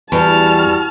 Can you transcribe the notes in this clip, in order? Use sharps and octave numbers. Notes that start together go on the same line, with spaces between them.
E2 G3 F#4 A5 F6